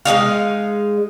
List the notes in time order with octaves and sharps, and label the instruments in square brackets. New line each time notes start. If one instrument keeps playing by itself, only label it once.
[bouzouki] G#3 A#3 D#4 F5